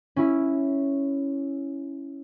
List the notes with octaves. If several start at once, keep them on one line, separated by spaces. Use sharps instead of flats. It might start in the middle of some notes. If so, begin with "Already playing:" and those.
C#4 E4